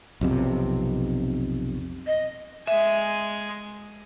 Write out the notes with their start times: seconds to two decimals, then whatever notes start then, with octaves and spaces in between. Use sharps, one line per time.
0.21 B1 F2 C3
2.06 D#5
2.67 G#3 E5 G#5